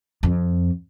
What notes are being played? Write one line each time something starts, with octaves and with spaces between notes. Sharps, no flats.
F2